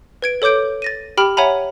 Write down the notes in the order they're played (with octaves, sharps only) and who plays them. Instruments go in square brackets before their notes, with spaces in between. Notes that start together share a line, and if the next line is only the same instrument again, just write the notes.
[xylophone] B4 G#6 D7
A4 C#5 D6 G6 D7
A6 A#6 D#7
G4 G5 B5 F6
C#5 E5 F#5 G#5 A#5 B5